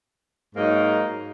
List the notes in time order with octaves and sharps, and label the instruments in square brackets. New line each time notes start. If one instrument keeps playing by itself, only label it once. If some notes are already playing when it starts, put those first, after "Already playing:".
[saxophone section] G#2 F#3 A#3 D#4